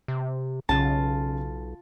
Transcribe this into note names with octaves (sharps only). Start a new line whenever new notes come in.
C3
B1 C#3 F4 A5